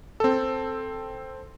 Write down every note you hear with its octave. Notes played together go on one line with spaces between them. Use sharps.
C4 A4